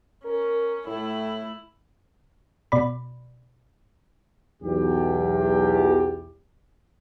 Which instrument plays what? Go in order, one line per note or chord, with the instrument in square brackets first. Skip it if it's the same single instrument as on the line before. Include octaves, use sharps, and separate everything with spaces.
[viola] C#4 [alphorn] A#4
[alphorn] A2 [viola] A3 E4
[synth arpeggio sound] B2 D5 B5
[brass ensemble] B1 E2 G4